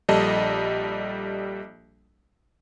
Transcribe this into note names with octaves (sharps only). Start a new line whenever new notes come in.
A#1 G3 A4 D#5 A5